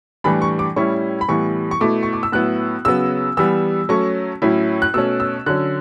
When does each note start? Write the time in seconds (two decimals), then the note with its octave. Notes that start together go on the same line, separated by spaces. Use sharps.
0.24 A2 E3 G3 D4 B5
0.42 C#6
0.59 D6
0.76 A2 G3 C#4 E4 C#6
1.21 B5
1.29 A2 E3 G3 B3 E4 C#6
1.71 C#6
1.81 B2 A3 E4 D6
2.03 C#6
2.13 D6
2.23 E6
2.32 A2 F#3 B3 E4 F#6
2.85 C#3 F#3 B3 E6
3.37 E3 G3 B3 E6
3.89 F#3 A3 C#4 C#6
4.42 A2 F#3 C#4 E4
4.82 F#6
4.94 B2 A3 C#4 E6
5.20 E6
5.46 D3 F#3 C#4 F#6